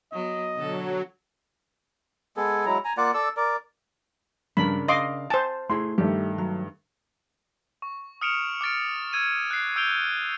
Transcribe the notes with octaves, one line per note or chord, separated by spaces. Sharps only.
F#3 B3 D#5
B2 D3 F#3 A4
G#3 B3 G#4 A4
F#3 G#3 E4 A#5
G#5 A#5
A#3 F4 D5 F#5
A4 D5 E6
A#4 D5
G2 C#3 D4 A#4 B5
D#5 F5 C6 D6
C5 G#5 A5
A3 E4 G#4 C6
G2 D#3 A3 G4
F#3
C#6
D#6 F6 C#7 D7 E7 F7
D6 F6 A6 D7
E6 G#6 D#7
F#6 C7
E6 G6 D7 F7 G7